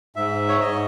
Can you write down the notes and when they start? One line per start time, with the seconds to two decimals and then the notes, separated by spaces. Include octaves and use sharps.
0.16 G#2 E5
0.48 C#5
0.61 G#2 D#5